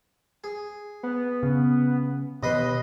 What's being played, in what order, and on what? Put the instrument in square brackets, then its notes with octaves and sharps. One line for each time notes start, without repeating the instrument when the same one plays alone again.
[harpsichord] G#4
[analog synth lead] B3
[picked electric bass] C#3
[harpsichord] D#2 B4 C6 [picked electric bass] B2 [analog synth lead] D#5